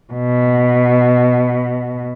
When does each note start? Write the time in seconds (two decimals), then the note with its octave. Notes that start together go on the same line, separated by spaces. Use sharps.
0.13 B2